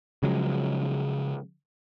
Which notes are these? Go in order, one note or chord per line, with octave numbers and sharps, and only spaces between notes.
C#3 F3 F#3 G#3